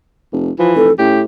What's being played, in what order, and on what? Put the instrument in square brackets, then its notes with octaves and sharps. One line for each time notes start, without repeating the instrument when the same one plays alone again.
[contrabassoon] F1
[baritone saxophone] E3 [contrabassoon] F3
[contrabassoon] F1 [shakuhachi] A4
[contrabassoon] A2 [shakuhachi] C#4 [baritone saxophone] G4